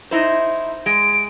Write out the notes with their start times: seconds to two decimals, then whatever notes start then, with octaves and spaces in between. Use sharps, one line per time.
0.11 D#4 E4 C5
0.86 G#3 D7